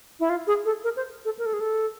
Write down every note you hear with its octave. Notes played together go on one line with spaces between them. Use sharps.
E4
F4
G#4
A4
A#4
C5
A4
A#4
A4
G#4
A4